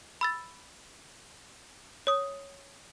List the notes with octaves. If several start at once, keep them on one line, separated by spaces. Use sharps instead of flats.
B5 E6 A6
C#5 D#6